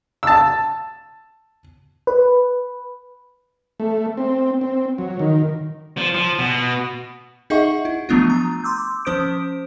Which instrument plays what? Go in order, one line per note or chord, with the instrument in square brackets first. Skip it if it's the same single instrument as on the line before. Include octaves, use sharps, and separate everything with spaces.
[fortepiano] A5 E6
[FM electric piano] B4
[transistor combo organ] A3
C4
C4
F#3
D#3
[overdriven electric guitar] F3
F3
B2
[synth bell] D#4 G#4 D#5 E5 F#5 C#6
E4
F3 F#3 A3 B3 D4 F4
A#5
C6 D6 E6 G6
F3 C#4 C5 D#6 G6 D7